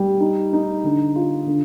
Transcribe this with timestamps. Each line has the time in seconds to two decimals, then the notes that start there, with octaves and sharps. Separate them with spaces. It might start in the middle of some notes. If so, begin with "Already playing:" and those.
Already playing: G3
0.20 D#4
0.53 D#4
0.84 D3
1.16 F4
1.46 D3